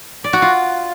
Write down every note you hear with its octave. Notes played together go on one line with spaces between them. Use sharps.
D5
F#4
F4